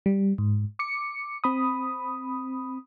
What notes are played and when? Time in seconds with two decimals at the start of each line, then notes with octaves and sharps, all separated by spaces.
0.06 G3
0.38 G#2
0.79 D6 C#7
1.44 C4 B5 D#6